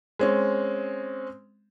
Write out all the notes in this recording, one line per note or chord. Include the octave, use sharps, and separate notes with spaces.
G#3 C4 C#4